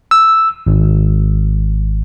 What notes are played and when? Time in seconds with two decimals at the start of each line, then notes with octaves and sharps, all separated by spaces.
0.11 E6
0.67 G#1